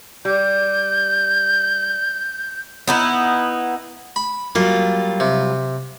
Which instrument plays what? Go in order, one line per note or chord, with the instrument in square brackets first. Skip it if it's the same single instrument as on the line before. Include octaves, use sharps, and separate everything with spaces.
[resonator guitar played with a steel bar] G3 [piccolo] G6
[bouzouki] B3 D#4 E4
[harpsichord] B5
[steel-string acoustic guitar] F#3 G3 F4 [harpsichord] A#3
[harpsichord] C3